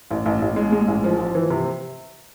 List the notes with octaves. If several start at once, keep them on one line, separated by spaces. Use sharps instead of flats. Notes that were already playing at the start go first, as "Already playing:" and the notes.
A1
A1
A1
G#3
G#3
A1
F3
F3
E3
C3